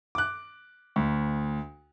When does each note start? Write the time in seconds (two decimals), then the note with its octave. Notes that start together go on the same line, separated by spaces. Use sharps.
0.15 D6 F#6
0.96 D2